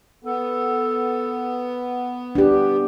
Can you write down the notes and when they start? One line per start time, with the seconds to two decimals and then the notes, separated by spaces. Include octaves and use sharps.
0.24 B3 A4
2.35 D4 G4 B4